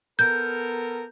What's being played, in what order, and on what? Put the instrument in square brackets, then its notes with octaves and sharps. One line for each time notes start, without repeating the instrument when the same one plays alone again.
[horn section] B3 A4 A#4 [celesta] G6